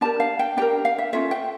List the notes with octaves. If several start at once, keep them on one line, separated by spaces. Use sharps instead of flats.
D4 G4 A#4 A5
F5
G5
D4 G4 A#4 G5
F5
E5
C#4 F4 A4 E5
G5